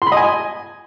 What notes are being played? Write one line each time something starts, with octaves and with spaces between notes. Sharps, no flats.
C6
B5
D#5
G#5